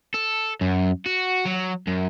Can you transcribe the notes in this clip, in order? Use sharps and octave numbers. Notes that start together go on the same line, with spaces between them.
A4
F#2
F#4
F#3
F#2